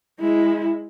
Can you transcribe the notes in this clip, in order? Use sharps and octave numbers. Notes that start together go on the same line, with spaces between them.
G#3 E4